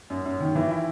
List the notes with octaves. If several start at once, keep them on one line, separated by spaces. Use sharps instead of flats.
F#2
F#2
D#3
E3
E4